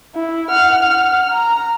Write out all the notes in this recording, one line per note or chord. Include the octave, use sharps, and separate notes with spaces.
E4
F#5 F6
F#5 F6
A#5